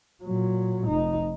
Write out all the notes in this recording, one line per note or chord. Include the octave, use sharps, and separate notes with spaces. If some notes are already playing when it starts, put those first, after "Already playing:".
A#2 F#3
F1 D#4